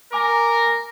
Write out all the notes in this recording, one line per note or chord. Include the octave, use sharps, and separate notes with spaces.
A#4 G#5 D6